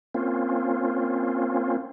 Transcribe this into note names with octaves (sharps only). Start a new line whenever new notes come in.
A#3 C4 C#4 F4